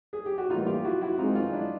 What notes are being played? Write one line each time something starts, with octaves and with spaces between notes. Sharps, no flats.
G#4
G4
F#4
A2 E3 G3 A#3 D#4 F4
F4 G4
E4 F#4
E4 F#4
D#3 G#3 C4 D#4 F4
D#4 F4
D4 E4